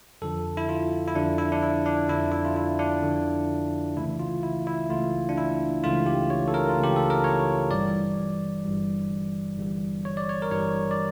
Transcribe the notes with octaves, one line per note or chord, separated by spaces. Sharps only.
F2 D3 F3 A4
E4
F4
E4
F2 D3 F3 D4
E4
D4
E4
D4
F2 D3 F3 E4
E4
F4
E4
D4
F2 D3 F3
C#2 C#3 E3 A3 E4
F4
E4
E4
C#2 C#3 E3 A3 F4
D4
E4
C#2 C#3 E3 A3 F4
G4
C#5
A4
A#4
F4
C#2 C#3 E3 A3
G4
A4
A#4
C#5
G1 G2 E3 G3 D5
G1 G2 E3 G3
G1 G2 E3 G3
C#5
D5
C#5
A#4
G1 G2 E3 G3 C#5
D5